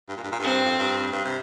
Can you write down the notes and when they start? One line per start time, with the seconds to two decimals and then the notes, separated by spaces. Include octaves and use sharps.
0.09 G2
0.17 A#2
0.23 G2
0.32 A#2
0.39 G2 C4
0.65 F2
0.79 G2
1.12 G2
1.25 C3